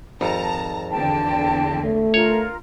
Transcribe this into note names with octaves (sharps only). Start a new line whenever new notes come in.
G#1 F2 A5 A#5
E2 D3 G5 A5
A3
F4 A#4 C#5